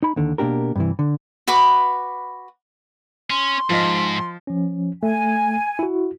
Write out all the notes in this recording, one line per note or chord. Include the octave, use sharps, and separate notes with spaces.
D#4 B5
D#2 D3 D#3
B2 A#3 D4 G4 A#4
G2 C3 E3
D3
F#4 B4 B5 D6
C#4 C6
G#2 F3 D#5 F6
F3 C#4
A3 G#5
E4 F#4